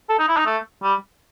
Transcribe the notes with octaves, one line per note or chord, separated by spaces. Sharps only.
A4
D#4
E4
D#4
A3
G3